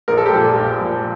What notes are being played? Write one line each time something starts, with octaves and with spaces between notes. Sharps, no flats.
A#1 A#4
A4
G4
A#2 F3 A4
A#1
A#2 F3